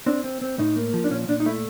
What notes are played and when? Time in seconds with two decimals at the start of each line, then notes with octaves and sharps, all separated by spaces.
0.06 C4 D4
0.24 C4
0.41 C4
0.59 A2 D#4
0.76 A#3
0.94 F3
1.04 D4
1.11 A#2 C#4
1.28 A#2 D4
1.40 D#4
1.46 A3 E4